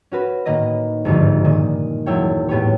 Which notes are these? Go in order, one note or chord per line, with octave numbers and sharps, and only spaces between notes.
C#4 F#4 B4
A2 D#3 A#3 B4 D#5 A#6
G#1 D2 G2 D#3 F3
A#2 D#3 D#6
E1 F#3 E4 C#5 G5
A2 B3 G4 C#5